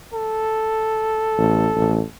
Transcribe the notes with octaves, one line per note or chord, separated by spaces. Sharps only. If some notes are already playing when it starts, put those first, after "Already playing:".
A4
A1
A1